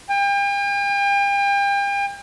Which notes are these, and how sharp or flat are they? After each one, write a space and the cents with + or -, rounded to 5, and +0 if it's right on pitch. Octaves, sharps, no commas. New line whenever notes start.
G5 +40